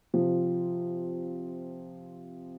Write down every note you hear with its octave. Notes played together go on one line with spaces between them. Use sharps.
C3 F3 C4 F4